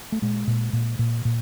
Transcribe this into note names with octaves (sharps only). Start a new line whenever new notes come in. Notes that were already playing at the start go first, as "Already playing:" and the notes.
A3
A#2 G#3
A#2
A#2
A#2
A#2